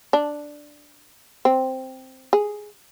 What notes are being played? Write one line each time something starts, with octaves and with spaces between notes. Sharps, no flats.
D4
C4
G#4